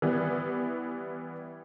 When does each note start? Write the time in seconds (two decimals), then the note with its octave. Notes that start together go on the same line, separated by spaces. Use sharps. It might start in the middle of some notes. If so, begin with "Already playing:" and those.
0.02 E3 G3 B3